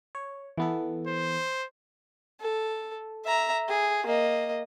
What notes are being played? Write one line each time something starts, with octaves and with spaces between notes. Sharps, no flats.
C#5
E3 B3 A4
C5
A4
E5 A#5
G#4
A#3 D#5